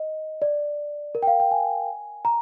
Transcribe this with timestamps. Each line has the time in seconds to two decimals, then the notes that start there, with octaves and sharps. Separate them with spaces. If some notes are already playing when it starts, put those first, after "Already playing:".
Already playing: D#5
0.42 D5
1.15 A#4
1.23 G5
1.27 F5
1.40 G5
1.51 G#5
2.25 A#5